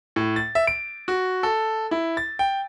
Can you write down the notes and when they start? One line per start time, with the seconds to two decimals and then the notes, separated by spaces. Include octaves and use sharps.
0.16 A2
0.36 A6
0.55 E5
0.67 D7
1.08 F#4
1.43 A4
1.91 E4
2.17 A6
2.39 G5